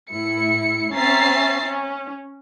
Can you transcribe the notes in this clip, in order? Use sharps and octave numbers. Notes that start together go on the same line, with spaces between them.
A2 E4 C#7
C4 C#4 E5 A#5 A6 C7
C#4